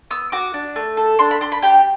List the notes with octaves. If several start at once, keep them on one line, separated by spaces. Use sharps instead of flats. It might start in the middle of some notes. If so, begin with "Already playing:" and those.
B3 E6
F#4 D6
D4
A3
A4
D4 C6
B5
D4 C6
B5
G4 G5